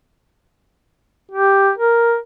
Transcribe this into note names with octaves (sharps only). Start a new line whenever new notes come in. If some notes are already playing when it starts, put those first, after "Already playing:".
G4
A#4